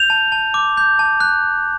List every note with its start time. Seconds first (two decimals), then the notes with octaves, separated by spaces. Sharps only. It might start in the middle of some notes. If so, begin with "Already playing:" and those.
Already playing: G6 F7
0.10 A5
0.32 A5
0.54 D6
0.77 G6
0.99 A5
1.20 F#6